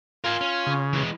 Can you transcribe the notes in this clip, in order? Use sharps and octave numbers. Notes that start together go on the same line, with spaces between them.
F4 A#4 G#5
C#4
C#3
E3 G#3